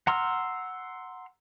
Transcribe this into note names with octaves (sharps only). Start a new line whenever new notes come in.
F#5 A#5 C6 E6 F6